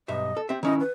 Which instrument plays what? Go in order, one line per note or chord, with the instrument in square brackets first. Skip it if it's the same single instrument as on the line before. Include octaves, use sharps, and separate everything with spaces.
[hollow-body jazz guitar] B1 G2 E5 [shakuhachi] D#5
[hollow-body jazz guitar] A4
[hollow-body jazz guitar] C4 E5 [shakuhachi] G4
[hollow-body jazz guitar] D#3 C#4 E4 [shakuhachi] D#5
[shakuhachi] B4